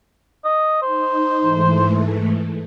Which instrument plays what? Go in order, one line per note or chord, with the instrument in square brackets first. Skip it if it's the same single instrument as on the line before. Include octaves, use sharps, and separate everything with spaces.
[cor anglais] D#5
[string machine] D#4 [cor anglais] C5
[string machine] G#2 E3 A3